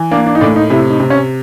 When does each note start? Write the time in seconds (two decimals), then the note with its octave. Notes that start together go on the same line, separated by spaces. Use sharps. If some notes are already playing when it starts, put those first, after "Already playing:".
Already playing: E3
0.11 A#3 D4
0.26 D4
0.35 D#4
0.41 A2 D4
0.56 D#4
0.70 C3 E4
0.90 D#4
1.00 C3
1.10 C#4